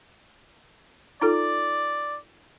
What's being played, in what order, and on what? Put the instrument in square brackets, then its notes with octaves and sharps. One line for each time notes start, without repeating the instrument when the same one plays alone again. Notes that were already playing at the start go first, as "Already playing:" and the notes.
[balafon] D#4 F4 A4 [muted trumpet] D5